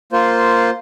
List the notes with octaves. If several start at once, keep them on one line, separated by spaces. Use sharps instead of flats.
A#3 F4 C5